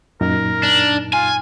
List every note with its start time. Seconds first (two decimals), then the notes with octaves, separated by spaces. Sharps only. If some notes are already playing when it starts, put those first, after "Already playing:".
0.21 F#2 A#2 D#4 A#4
0.63 D4
1.13 F4 G#5